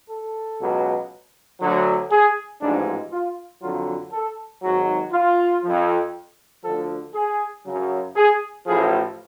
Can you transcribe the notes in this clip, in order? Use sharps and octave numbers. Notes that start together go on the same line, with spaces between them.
A4
C#2 B2 F#3
D2 D3 F#3
G#4
A1 G#2 F3 D4
F4
F2 D3 F#3 F4
A4
G#1 G#2 F#3 F#4
F4
F2 F3
D2 D3 F3 A4
G#4
F#2 C#3 F#3
G#4
A1 A2 F3 G#4